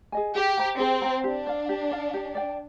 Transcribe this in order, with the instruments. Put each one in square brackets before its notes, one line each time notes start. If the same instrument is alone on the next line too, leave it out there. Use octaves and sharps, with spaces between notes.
[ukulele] G#4 D#5 G#5
[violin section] G4 [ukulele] G#4
[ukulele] C5 G5 A#5
[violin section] C4 [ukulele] G#4
[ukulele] C5 G5 A#5
[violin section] D4 [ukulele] G4
[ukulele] D5 F5
G4
D5 F5
G4
D5 G5